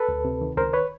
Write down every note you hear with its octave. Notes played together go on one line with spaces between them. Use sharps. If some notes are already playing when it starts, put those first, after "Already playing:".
Already playing: A4 B4
D2
C3
D#3
C#2 A#4 C5
B4 C#5